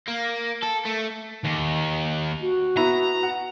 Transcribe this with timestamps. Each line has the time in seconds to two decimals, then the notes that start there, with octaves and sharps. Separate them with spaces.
0.08 A#3
0.63 A4
0.86 A3
1.45 D#2
2.41 F#4
2.77 B3 E4 A#5
3.23 F#5